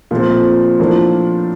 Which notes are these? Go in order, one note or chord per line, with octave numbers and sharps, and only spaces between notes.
A#2 F3 A3 C4
A2 F3 A#3 D4